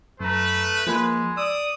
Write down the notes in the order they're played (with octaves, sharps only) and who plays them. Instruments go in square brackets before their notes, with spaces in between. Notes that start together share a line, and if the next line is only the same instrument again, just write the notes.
[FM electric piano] F#2 A#5 [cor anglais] A3 [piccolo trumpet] B4
[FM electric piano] F3 A#3 B5 [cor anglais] G#3
[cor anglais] D5 [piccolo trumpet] D#6 [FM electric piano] E6